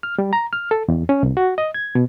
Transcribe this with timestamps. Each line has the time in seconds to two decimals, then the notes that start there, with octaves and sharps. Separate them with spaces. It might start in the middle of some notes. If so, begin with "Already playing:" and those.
0.03 F6
0.19 G3
0.33 A#5
0.53 F6
0.71 A4
0.88 E2
1.09 C#4
1.23 C2
1.37 F#4
1.58 D#5
1.74 G#6
1.95 B2